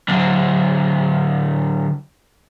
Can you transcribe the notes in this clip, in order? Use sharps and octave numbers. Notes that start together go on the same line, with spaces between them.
D3 F#3